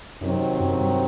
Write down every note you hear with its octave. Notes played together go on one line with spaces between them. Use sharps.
F#2 C3 D#3 F#3 C4 D#4
F#2
G2